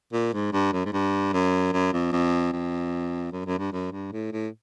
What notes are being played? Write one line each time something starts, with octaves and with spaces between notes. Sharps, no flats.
A#2
G#2
G2
F#2
G#2
G2
F#2
F#2
F2
F2
F2
F#2
F#2
G2
F#2
G2
A2
A2